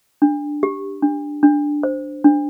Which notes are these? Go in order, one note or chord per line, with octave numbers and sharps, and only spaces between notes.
D4
G4
D4
D4
C5
D4